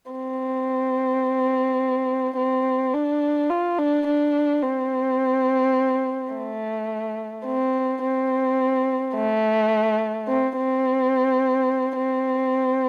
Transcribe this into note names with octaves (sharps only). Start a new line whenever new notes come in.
C4
C4
D4
F4
D4
D4
C4
A3
C4
C4
A3
C4
C4
C4